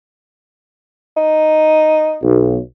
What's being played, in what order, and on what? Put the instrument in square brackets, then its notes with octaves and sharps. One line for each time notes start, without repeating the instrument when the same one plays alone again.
[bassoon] D#4
[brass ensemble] B1